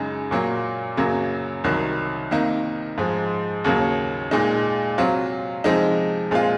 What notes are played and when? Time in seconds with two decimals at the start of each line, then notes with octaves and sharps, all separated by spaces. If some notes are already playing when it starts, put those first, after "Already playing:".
Already playing: F#2 C#3 G#3 D#4
0.31 A#2 F#3 A#3
0.97 F#2 C#3 F#3 A#3
1.64 C2 C3 D#3 F#3
2.31 C3 D#3 A#3 D#4
2.98 G#2 F3 G#3
3.64 D#2 C#3 F#3 A#3
4.31 A#2 G#3 D#4
4.98 C3 F#3 C4 F4
5.64 C3 F3 G#3 D#4
6.31 A#2 G#3 C4 F4